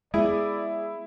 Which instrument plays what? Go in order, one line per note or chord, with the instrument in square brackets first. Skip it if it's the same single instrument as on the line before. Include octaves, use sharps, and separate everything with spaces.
[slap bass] G#3 B3 [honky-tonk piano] E4 [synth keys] G#4 [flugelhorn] D5